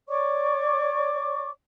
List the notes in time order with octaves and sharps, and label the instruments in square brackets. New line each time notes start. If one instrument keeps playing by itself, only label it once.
[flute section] C#5 D5 C#6 D6